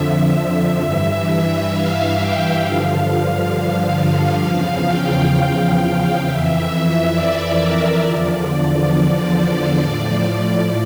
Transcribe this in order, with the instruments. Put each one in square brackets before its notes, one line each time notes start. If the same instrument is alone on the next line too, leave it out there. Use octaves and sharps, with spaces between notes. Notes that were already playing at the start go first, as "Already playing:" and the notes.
Already playing: [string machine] F2 D3 F3 E5
G2 E3
F5
G5
G2 D3 F3 F5
F5
E2 C#3 F3 F5
G5
F5
F2 E3 E5
D5
A#4
E2 D3 F3 D5
A2 F3